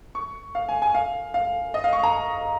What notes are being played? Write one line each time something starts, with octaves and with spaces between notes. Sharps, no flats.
C#6
F5
G#5
G#5
F5
F5
D#5
F5
C#6
A#5